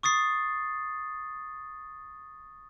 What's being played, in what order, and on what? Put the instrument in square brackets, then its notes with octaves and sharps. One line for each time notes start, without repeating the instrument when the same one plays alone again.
[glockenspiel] C#6 D#6 A6 C7